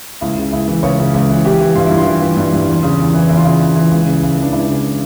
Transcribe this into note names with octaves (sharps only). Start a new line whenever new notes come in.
C#2 E4
C#3
C#2 E4
E3
C#2 C#5
C#3
C#2
E3
E3 G4
E3
G2 F4
G2 E4
F4
E3
E3
G2
G2
E2
C#3
E2
E3
E2 E4
F4
C#3 E4
E2
E3
C#2
C#3
C#2
E3 D4
C#2 E4
C#3